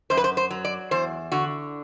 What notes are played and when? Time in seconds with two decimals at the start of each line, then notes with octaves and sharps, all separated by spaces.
0.10 F#2 C5
0.17 B4
0.24 C5
0.37 C5
0.50 F#3
0.65 D5
0.91 E2 C5
1.32 D3 F#4